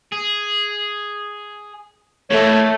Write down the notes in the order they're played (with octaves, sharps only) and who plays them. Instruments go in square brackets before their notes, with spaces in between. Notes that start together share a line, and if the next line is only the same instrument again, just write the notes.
[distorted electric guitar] G#4
[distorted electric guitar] E3 A#3 [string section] A3 [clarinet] C#5